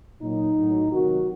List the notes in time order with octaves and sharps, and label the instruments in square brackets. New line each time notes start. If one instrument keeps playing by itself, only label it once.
[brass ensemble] A#2 F#3 D#4
A2 F#3
C3 D#3 F#3 F#4